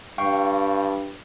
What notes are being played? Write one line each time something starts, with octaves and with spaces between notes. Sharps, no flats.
G2 F5 G5 C#6